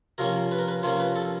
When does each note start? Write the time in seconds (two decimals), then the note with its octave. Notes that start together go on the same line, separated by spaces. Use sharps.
0.18 C3 F3 A#3 C#4 A#4
0.52 B4
0.59 A#4
0.68 B4
0.83 C3 F3 A#3 C#4 C5
1.00 B4
1.16 A4